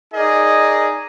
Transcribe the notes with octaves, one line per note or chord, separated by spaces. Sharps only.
D#4 G#4 A#4 D5 D#5